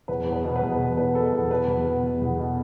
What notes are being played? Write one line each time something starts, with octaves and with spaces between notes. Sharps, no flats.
E2 B4
E2
B4
B2
B4
E2
E2
B2 B4
B2 A4
E2
B2 B4
E2
B2
E2
E2
B2